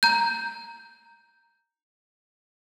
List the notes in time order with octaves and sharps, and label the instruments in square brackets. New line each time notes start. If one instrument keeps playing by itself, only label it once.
[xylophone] A#5 G6